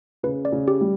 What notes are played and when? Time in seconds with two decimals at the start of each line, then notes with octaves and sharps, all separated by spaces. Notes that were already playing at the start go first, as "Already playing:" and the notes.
0.23 C#3 B4
0.45 D5
0.52 C#3
0.68 G4
0.81 G3